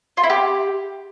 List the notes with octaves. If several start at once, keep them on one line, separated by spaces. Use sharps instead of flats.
F4
E4
G4